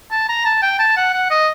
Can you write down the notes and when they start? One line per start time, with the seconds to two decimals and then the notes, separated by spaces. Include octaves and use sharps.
0.11 A5
0.29 A#5
0.45 A5
0.63 G5
0.80 A5
0.97 F#5
1.14 F#5
1.31 D#5